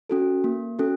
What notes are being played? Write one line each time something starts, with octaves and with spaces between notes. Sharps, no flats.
C#4 F#4 A4
A#3
C#4 F#4 A4